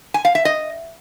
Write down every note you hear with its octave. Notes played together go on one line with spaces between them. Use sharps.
G#5
F5
E5
D#5